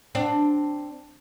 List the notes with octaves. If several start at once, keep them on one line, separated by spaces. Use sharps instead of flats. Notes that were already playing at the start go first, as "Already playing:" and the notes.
C4 D4